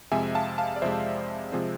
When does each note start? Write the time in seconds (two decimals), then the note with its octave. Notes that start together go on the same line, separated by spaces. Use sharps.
0.12 F2 C3 G#3 E5 G#5
0.35 F5 A5
0.58 F5 A5
0.76 D5
0.82 F2 C3 G#3 C5 E5
1.52 C3 F3 G#3 C4